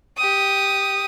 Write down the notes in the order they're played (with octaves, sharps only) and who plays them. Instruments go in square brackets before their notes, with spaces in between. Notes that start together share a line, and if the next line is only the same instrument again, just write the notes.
[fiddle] G4 D#6